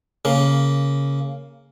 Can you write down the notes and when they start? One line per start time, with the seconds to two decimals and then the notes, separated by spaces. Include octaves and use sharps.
0.25 C#3 A#3